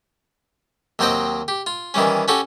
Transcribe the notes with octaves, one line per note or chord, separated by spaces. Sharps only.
D#2 F#3 C4 C5 D#5 G5
G4
F4
D#3 E3 G3 C#4
C#4 F#4 G4 A4